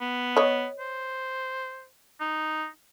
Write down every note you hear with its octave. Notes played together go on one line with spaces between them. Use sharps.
B3
C#5 D#5
C5
D#4